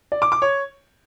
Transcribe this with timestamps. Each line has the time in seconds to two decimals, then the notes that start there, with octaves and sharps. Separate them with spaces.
0.12 D5
0.22 D6
0.32 D6
0.42 C#5